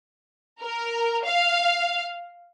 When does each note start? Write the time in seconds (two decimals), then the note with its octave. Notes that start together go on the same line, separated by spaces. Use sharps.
0.61 A#4
1.25 F5